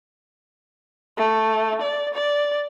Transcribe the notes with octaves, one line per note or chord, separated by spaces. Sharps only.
A3
D5
D5